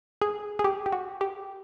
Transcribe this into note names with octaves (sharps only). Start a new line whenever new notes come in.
G#4
G#4
G4
G4
F#4
G4